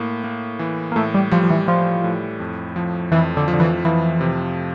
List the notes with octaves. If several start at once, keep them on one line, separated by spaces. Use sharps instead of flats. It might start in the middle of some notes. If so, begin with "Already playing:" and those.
Already playing: A2 A#3
A#3
E3
A#3
A2 A3
G3
F3 G3
F3
E3
F3 G3
A2
F2
F3
F2 E3
D3
F3
D3
E3
E3 F3
C3